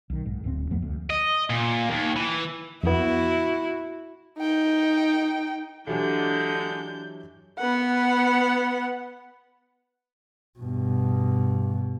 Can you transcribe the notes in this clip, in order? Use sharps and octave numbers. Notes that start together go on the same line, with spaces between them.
B1 D#3
G#2
D1 D2 E3 C4
F2 F3 A3 B3
D2
D#5
A#2
D#2
E3
F2 B3 E4 F#4
D#4 G5
D3 E3 F#3 G#3 D4 G4 G6
B3 F#5
G2 B2